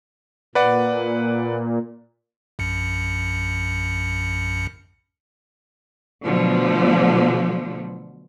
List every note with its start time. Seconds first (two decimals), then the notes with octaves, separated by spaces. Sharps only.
0.55 A#2 B4 D5 F#5
2.59 A#1 F#2 C#7
6.24 B2 D3 F3 F#3 A3